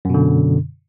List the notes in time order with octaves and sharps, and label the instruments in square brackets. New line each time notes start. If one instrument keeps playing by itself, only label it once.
[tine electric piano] F#2
B2
D3